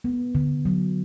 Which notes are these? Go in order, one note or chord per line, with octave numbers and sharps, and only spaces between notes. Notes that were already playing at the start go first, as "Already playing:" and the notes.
B3
D3
F#3